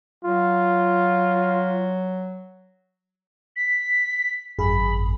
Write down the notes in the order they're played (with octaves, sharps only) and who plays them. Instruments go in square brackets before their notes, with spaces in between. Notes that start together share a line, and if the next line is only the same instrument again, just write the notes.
[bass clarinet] F#3 [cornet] F4
[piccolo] B6
[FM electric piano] G#1 F#2 G#4 [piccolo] B5